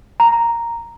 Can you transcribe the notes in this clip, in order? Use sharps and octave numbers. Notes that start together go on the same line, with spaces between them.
A#5